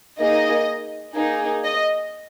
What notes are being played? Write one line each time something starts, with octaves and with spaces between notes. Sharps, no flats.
A#3 D#4 G#4 D#5
A#3 D#4 G#4
D#5